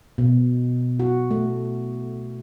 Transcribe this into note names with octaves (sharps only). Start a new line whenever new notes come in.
B2
F#4
A3